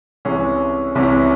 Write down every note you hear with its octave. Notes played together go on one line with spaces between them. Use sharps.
C2 C3 E3 G#3 C#4 G#4
C2 C3 E3 G#3 C#4